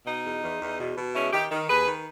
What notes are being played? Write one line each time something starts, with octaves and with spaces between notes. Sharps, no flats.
B2 D#4
E2
E2
E2
B2
B2
G#3 C#4 E4
D#3 D#4 G4
D#3
D#2 G#4 B4
D#3